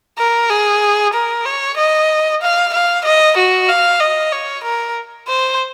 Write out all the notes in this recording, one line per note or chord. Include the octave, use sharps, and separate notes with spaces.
A#4
G#4
A#4
C#5
D#5
F5
F5
D#5
F#4
F5
D#5
C#5
A#4
C5